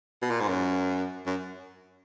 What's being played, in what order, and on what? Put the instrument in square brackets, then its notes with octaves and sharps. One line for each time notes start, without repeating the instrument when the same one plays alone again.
[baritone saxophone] B2
A#2
G#2
F#2
F#2